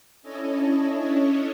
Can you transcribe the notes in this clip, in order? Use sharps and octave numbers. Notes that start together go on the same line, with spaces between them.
C#4 D4 E4 A4 C#5 D#5